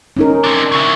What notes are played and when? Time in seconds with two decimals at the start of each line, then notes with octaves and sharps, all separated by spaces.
0.17 C#4 D#4 A#4
0.44 C4 D4
0.72 C#3 E4